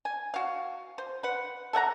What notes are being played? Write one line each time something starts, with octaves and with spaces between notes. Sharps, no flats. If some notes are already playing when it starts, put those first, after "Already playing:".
G#5
F#4 F5
C5
B4 F#5
A4 E5 F#5 A#5